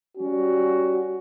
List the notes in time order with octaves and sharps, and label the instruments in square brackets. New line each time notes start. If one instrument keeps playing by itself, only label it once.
[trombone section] G3 C#4 F#4